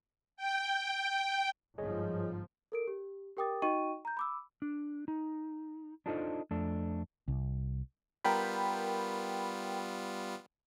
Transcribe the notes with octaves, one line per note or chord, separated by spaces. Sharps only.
G5
G1 G#2 F3 G#4 C#5 D#5
A4 A#4 D7
G4
G4 A#4 G5 D6 D#6 A6
D#4 F#4 D#5 G5 C#6 D#7
A#5 G6
B5 D6 E6
D4
D#4
D4 D#4 F4 A4 C5 D#5
F2 A3 D4
C2
G3 B3 F4 A#4 G5 B5